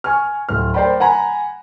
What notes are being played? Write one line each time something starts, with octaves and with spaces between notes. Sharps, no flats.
G#5 C#6 F6
D1 F6
A#4 C5 D5 G5 B5
F#5 G#5 A#5 B5